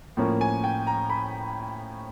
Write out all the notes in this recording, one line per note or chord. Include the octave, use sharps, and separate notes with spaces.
A2 F3 A#3 C#4
G#5
G5
A#5
B5